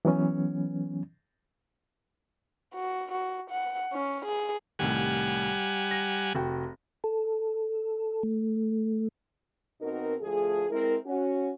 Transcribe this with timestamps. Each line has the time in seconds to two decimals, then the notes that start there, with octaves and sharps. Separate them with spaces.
0.05 E3 F#3 B3 C#4
2.74 F#4
3.12 F#4
3.50 F#5
3.93 C#4
4.25 G#4
4.79 C2 A2 D#3 G3 F#5 G#5
5.91 A#6
6.35 F1 F#4 G5
7.04 A4
8.23 A3
9.81 B2 C4 D#4 F#4 A#4
10.21 D2 F3 A3 G#4
10.70 G#3 C4 E4 A#4
11.06 C#4 F#4